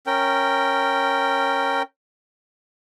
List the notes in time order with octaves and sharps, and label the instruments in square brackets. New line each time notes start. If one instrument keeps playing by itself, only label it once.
[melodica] C#4 A#4 G5